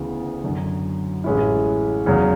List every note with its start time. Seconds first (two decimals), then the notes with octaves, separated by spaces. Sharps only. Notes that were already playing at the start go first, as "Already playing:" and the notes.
Already playing: D2 C#3 E3 B3
0.44 F#2 D3 F#3
1.24 A1 A2 G#3 C#4 E4
2.06 E2 C#3 F#3